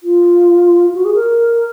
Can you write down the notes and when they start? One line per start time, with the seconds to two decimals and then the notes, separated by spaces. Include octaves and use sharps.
0.03 F4
0.95 F#4
1.05 G#4
1.15 A#4